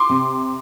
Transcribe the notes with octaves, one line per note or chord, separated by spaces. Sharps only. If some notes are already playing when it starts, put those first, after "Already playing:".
Already playing: C6 D6
C3